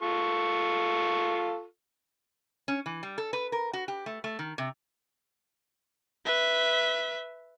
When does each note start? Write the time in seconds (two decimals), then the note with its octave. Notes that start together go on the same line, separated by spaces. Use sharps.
0.02 F4 A4 C#6
2.68 C#4
2.86 E3
3.03 G3
3.18 A4
3.33 B4
3.52 A#4
3.73 F#4
3.88 G4
4.06 A3
4.24 A3
4.39 D#3
4.58 C3
6.25 B4 E5